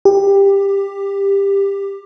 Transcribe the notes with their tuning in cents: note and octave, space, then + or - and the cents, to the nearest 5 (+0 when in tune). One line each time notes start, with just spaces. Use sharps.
G4 +15